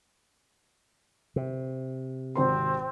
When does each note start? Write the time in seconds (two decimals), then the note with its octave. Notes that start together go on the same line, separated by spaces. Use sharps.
1.36 C3
2.35 G#1 C4 C5 C6